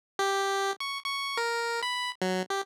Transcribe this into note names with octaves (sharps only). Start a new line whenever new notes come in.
G4
C#6
C#6
A#4
B5
F#3
G4